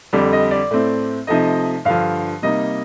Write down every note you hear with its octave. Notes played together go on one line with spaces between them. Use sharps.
F2 D3 G3 D5
D#5
D5
A2 A3 C4
C3 F3 A3 D#4 D#5
G2 D3 F3 F5
C3 G3 A#3 D#4 D#5